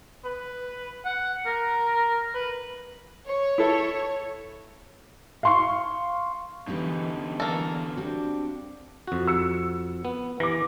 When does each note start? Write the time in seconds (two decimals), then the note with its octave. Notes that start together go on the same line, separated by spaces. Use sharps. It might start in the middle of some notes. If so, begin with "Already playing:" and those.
0.25 B4
1.05 F#5
1.46 A#4
2.34 B4
3.25 C#5
3.58 E4 A4
5.43 F5 C6 C#6
6.67 B2 D3 E3 G3 C#4 D#4
7.40 E3 G3 A#3 A4
7.96 G3 C4 D4 F#4
9.07 F2 F#4
9.27 E6 C#7
10.05 B3
10.40 E3 D6 A#6